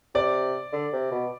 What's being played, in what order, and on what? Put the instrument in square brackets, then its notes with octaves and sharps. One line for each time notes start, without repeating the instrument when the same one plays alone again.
[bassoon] C3 [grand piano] D5
[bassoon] D3
C3
B2